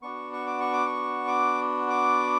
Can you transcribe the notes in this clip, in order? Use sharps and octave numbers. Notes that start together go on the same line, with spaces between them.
B3 D4 F#4 C#6
C#6
D6
C#6
D6
C#6
D6
D6